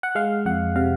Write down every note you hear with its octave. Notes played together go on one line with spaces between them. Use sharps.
F#5
G#3 F5
F2 F#5
C3 F5